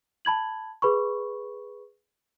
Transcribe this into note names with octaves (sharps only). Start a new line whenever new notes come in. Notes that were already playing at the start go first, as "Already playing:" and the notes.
A5 B5 G#6 F#7
G#4 B4 B5 C#6